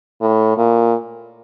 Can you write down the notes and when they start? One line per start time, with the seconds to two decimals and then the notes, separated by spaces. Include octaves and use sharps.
0.21 A2
0.58 A#2